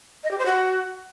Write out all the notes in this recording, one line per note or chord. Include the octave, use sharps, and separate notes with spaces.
D#5
G4
C5
F#4